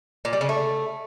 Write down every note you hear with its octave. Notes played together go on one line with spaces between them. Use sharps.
A#2
G3
C#3
A3